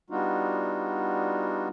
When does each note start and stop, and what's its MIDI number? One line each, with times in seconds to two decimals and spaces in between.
0.10 1.68 55
0.10 1.68 59
0.10 1.68 62
0.10 1.68 63
0.10 1.68 65
0.10 1.68 66